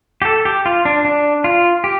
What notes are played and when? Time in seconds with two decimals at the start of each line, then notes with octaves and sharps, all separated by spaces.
0.22 G4
0.25 A4
0.45 G4
0.66 F4
0.85 D4
1.05 D4
1.44 F4
1.84 G4